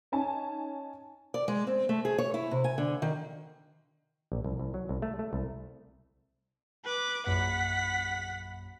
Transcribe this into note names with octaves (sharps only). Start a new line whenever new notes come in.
C#4 D#4 G#5 A5
D5
G#3
C4
A3
G#4
C#5
E4
C3
G#5
D3
D#3
A#1
C2
C2
F#3
C2
A3
A3
C2
B4 D6
A#1 F#2 F#5 B5 B6